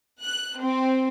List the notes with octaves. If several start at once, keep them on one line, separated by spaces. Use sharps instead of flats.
F#6
C4